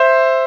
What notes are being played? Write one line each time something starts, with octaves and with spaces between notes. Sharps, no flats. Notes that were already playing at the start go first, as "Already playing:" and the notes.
Already playing: C5 E5